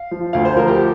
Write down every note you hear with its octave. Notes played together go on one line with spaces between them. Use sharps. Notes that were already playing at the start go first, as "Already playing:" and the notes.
Already playing: F5
F3
D2 F5
C5
F3 A#4
G4